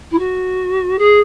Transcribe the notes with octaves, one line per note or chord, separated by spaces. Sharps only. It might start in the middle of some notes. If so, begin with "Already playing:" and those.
E4
F#4
G#4